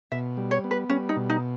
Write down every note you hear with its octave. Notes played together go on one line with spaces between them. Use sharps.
B2 E5
G3
C#5
B3
B4
G3 C#4
D#4
B2
D#4